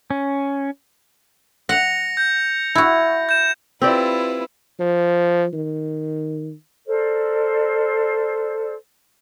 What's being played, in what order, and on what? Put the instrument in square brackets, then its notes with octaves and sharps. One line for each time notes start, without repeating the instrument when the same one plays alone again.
[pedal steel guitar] C#4
[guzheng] F#5 [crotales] A#6 C#7 F7
[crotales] G6
[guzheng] E4 F#4
[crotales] G6 E7
[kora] C4 G4 D5 [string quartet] E4 F4 B4
[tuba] F3
D#3
[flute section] A4 A#4 C5 D5